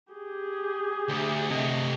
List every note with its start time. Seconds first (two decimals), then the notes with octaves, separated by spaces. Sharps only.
0.12 G4 G#4
1.08 D2
1.51 C3 A3 D#5